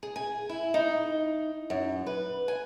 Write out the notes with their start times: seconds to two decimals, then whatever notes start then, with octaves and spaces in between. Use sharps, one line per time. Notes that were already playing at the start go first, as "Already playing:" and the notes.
0.03 G#4
0.16 G#5
0.49 E4
0.74 D#4
1.70 F#2
2.07 B4
2.48 G#5